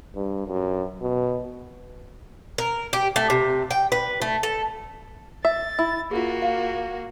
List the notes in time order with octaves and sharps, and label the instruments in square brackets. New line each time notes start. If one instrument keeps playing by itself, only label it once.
[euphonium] G2
F#2
B2
[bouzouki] A#4
G4
A3
C3
G5
B4
A3
A4
[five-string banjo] E5 [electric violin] A6
[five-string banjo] E4
[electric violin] A#3 F#4 [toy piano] F4 G#4
[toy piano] F5